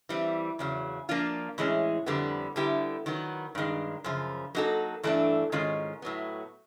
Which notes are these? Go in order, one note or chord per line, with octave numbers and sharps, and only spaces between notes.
E3 G3 C4
E2 C#3 F#3
F3 A#3 D4 F4
A2 E3 G#3 C#4
F2 D3 G3 B3
D3 G3 B3 E4 G4
D#3 F#3 B3
G2 D#3 G#3
F#2 C#3 F3
F#3 A#3 D#4 F#4 A4
G2 E3 A3 D4
G#2 D#3 G#3 C#4 F4
A2 F#3 B3